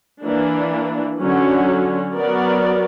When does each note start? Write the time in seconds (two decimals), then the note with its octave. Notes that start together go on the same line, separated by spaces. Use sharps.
0.24 E3 A#3 D4
1.20 D3 F#3 C#4 F#4
2.16 F#3 B3 F#4 A#4 D5